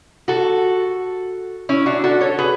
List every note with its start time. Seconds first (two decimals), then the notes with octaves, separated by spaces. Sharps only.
0.28 F#4 A4
1.69 C#4 E4
1.86 D4 F#4
2.04 F#4 A4
2.20 A4 C#5
2.38 G#4 B4